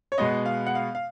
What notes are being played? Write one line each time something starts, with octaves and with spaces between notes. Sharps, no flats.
C#5
B2 G#3 B3 D#5
F5
F#5
F5
F5